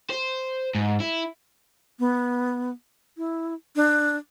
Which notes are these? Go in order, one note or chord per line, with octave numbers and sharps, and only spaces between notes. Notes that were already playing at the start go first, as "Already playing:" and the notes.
C5
G#2
E4
B3
E4
D4